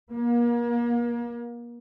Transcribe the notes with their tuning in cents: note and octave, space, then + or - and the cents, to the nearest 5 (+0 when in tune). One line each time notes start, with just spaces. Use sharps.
A#3 +35